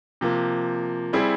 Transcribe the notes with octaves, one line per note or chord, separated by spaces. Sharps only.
C3 F3 A#3
G3 C4 E4 G#4